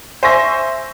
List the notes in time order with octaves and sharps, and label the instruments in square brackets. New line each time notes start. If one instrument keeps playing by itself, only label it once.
[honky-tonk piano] C5 E5 G#5 C6 C#6 A#6